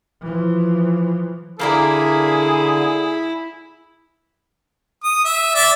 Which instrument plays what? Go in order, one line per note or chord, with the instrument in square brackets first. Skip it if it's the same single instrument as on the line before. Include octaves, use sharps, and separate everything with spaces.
[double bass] E3 F3
[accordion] D3 [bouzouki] A#3 A#4 D5 [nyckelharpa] E4 [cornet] G#4
[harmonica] D#6
E5
D5 E5